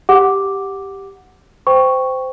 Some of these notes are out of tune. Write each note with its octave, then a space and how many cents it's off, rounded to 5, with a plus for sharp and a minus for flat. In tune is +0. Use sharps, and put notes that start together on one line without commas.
G4 +0 F#5 -5 D6 +0
C5 -20 G5 +0 C#6 +0